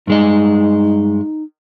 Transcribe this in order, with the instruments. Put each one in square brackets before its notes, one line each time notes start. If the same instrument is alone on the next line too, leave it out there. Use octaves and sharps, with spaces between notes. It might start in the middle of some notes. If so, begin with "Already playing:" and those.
[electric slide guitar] G2 G#3 D#5 [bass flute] D#4